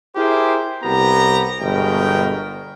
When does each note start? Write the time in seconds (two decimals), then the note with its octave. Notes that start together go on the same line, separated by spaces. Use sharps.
0.16 E4 G4 G#4 A#4 C5
0.83 C2 B3 G4 A#5
1.61 G1 B2 G#3 A#4 G5